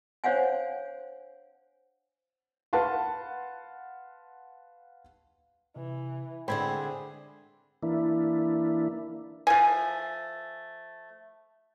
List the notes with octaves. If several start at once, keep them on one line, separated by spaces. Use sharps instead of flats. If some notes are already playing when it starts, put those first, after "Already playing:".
D4 C5 C#5 F5 F#5 G#5
B4 F5 F#5 A5 C6
C3 E3
D3 G#3 C4 G#4 C5 G5 B5 G#6
E3 A#3 D4 E4
F3 A3 G#5